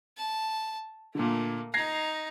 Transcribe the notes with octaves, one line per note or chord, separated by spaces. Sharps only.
A5
A#2 D3 A3 A#3
D#4 A#5 G#6 A#6 C7